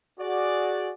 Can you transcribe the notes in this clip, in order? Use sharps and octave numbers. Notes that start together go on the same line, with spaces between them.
F#4 G#4 D5